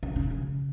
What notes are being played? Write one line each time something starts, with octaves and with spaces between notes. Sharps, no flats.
C#3
C#3
C#3